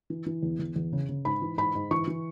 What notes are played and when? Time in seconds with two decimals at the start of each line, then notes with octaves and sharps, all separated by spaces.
0.10 E3
0.26 E3
0.43 E2
0.59 E2
0.76 E2
0.93 C#3
1.09 C#3
1.25 G#2 B5
1.42 E3
1.58 G#2 B5
1.75 G#2
1.91 E3 C#6
2.07 E3